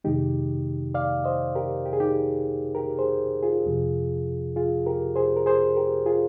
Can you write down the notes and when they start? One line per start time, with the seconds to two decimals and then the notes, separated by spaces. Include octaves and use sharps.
0.04 F2 C3 D#3 G#3 D#4 G4
0.94 D5 F5
1.24 C5 D#5
1.55 G4 A#4
1.86 G4
1.93 G#4
2.00 D#4 G4
2.75 G4 A#4
2.99 G#4 C5
3.43 F4 G#4
3.66 F2 C3 F3
4.56 F4 G#4
4.86 G4 A#4
5.16 G#4 C5
5.36 A#4
5.46 G#4 C5
5.76 G4 A#4
6.06 F4 G#4